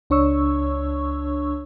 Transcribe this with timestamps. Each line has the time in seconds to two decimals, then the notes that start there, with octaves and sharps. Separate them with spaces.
0.10 C#2 D4 C#5 C#6 E6